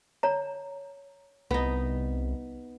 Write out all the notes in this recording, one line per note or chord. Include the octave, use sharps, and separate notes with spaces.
C#5 A#5
C2 B3 D#4